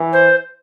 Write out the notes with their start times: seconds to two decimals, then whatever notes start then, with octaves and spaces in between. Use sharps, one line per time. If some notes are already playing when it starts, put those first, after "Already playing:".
Already playing: E3
0.13 C5